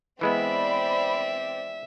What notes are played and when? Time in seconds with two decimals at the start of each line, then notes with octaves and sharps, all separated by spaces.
0.21 E3 G#3 B3 C4 D5 E5 B5